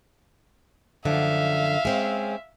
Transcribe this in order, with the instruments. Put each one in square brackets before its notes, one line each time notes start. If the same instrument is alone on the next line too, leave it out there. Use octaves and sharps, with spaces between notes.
[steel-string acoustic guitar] F#2 D3 F3 [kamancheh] E5 F5
[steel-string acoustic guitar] G#3 C4 C#4